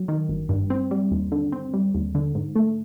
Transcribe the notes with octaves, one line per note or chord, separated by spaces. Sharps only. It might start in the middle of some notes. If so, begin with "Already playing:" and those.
Already playing: F#3
D#3
G1
G2
C4
G3
D#2
D3
C4
G3
D#2
D3
G#2
A3